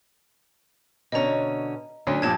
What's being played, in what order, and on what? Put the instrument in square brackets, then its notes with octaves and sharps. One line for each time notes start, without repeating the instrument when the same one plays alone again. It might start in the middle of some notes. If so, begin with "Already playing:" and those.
[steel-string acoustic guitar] B2 D3 C#4 [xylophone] D#5 A#5
[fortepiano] D2 [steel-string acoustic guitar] F#3 C#4 D4
[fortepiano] G2 A#2 F3 [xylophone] A5 G#6